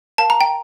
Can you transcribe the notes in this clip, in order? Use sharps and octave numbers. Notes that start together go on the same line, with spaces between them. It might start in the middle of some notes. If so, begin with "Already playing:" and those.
A#4 F5 A5
A#5
G5